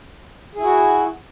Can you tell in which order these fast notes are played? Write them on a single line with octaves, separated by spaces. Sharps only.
G#4 E4 F#4